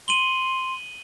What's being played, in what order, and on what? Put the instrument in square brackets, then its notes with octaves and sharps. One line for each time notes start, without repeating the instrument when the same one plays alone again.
[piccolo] C6 [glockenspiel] D#7 F#7 G7